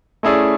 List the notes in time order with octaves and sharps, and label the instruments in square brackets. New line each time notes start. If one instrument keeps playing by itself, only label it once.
[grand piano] A3 C#4 E4 G#4 D5